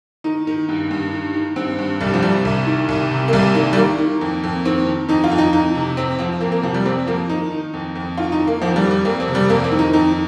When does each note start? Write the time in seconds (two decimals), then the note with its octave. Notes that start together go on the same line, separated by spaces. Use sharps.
0.24 D#3 D#4
0.47 D#3
0.69 G2
0.91 G2
1.13 D#3
1.34 D#3
1.56 G2 C4
1.79 G2
2.00 C2 G3
2.14 F3
2.22 C3 G3
2.45 C2
2.67 D#3
2.89 C2
3.11 C3
3.28 A#3
3.33 C2 G3
3.55 D#3 A#3
3.73 G3
3.77 D#3 A#3
3.98 D#3
4.21 F2
4.44 F2
4.65 D#3 C4
4.86 D#3
5.08 F2 D#4
5.24 F4
5.31 F2
5.38 D#4
5.53 F2 D#4
5.75 C3
5.97 F2 C4
6.19 F3 C4
6.41 F2 A#3
6.52 A#3
6.63 C3 F3
6.74 G3
6.86 F2 C4
7.07 F3 A#3
7.29 D#3 D#4
7.52 D#3
7.74 F2
7.95 F2
8.18 D#3 F4
8.32 D#4
8.40 D#3
8.47 A#3
8.62 F2 F3
8.76 G3
8.83 F2
8.91 G3
9.05 F2 A#3
9.20 C4
9.28 C3
9.35 G3
9.50 F2 A#3
9.64 C4
9.72 D#3
9.79 D#4
9.93 F2 D#4